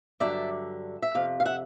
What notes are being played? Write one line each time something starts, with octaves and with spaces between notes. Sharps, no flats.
G2 D3 F#3 D5 E5
E5
F2 C3 F5
F5
E5 F#5